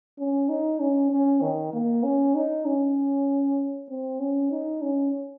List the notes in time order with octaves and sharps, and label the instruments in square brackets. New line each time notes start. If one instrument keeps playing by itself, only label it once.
[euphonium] C#4
D#4
C#4
C#4
D#3
A#3
C#4
D#4
C#4
C4
C#4
D#4
C#4